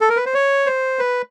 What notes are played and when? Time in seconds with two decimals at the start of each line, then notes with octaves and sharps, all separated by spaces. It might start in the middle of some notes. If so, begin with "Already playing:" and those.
0.01 A4
0.09 A#4
0.16 B4
0.26 C5
0.34 C#5
0.66 C5
0.99 B4